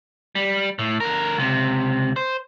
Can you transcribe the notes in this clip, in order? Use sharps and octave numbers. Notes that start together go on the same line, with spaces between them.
G3
A2
D3 A#4
C#2 C3
C5